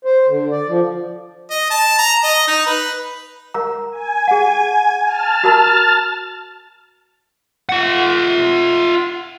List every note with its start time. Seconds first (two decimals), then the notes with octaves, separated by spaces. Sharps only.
0.05 C5
0.28 D3
0.51 D5
0.68 F3
1.50 D#5
1.70 A5
1.98 A#5
2.23 D#5
2.47 D#4
2.66 B4
3.54 A#4 A#5
3.91 G#5
4.28 G#4 F#5
5.03 A5 F6 A6
5.44 F#4 A#4 A#5
7.69 F4 F#5